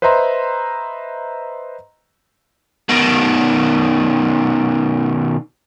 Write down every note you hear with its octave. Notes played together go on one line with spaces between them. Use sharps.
B4 C5 D#5 E5 A#5 C6
B2 D#3